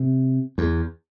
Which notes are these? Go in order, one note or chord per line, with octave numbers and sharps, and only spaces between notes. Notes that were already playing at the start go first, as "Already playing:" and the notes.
Already playing: C3
E2